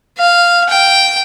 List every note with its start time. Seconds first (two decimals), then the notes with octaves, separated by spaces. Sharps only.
0.18 F5
0.69 G5